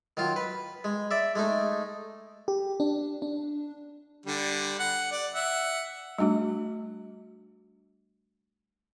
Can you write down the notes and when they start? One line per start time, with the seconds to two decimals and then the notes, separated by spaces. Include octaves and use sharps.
0.17 D#3 F#3 F4
0.36 B4
0.84 G#3
1.11 D5 E5
1.35 G#3 A3 D#4
2.48 G4
2.80 D4
3.22 D4
4.26 D3 G3
4.80 F#5
5.12 D5
5.34 E5 F#5
6.18 G3 A3 D4 F#4